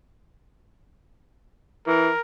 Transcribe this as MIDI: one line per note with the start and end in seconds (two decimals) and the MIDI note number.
1.87 2.09 52
1.87 2.21 70